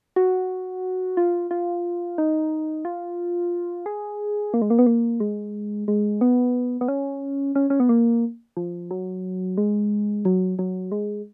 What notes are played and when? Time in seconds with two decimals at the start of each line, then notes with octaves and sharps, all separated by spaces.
0.16 F#4
1.17 F4
1.51 F4
2.18 D#4
2.85 F4
3.86 G#4
4.54 A#3
4.62 G#3
4.70 A#3
4.79 B3
4.86 A#3
5.20 G#3
5.88 G#3
6.21 B3
6.81 B3
6.88 C#4
7.55 C#4
7.70 C#4
7.80 B3
7.89 A#3
8.57 F3
8.91 F#3
9.57 G#3
10.25 F#3
10.59 F#3
10.92 G#3